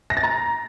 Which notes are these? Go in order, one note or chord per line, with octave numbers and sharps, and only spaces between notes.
A#6
A6
A#5